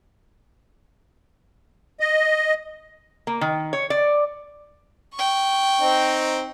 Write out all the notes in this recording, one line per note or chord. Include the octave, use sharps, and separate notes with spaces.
D#5
A#3
D#3
C#5
D5
G5 C#6
C4 D#4